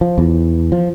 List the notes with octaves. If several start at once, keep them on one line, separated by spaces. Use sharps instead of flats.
F3
E2
F3